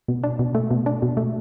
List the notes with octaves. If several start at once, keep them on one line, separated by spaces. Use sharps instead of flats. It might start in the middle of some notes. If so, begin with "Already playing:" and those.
B2
D4
B2
A3
B2
D4
B2
A3